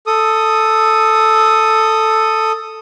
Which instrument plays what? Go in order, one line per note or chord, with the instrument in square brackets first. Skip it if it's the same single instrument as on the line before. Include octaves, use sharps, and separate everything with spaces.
[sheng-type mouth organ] A4 D#6